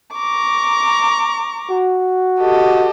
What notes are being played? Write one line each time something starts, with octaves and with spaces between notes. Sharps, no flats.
A#5 C#6 D6
F#4
G4 A4 D#5